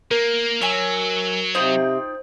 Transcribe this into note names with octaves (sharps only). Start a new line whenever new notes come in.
A#3 A#4
F#3 C#5 E5 G#5
C3 D#4 F4 C5 G5